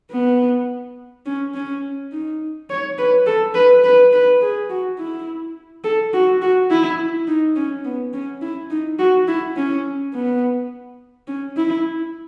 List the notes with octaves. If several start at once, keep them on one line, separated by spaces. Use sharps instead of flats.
B3
C#4
C#4
D#4
C#5
B4
A4
B4
B4
B4
G#4
F#4
E4
A4
F#4
F#4
E4
D#4
C#4
B3
C#4
E4
D#4
F#4
E4
C#4
B3
C#4
E4